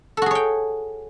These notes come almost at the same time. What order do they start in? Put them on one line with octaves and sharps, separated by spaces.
A4 F#4 G#4 C#5 G5